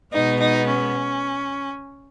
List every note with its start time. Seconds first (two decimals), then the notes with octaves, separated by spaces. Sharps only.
0.12 B2 G#3 B3 D#4
0.40 D#4
0.69 C#4